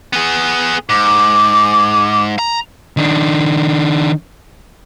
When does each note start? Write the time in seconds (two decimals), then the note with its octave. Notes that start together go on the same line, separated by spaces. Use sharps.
0.13 B3 G#4
0.89 G#2 D6
2.39 A#5
2.97 D#3 D4